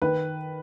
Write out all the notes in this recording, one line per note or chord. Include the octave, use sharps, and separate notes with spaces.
D#3 B4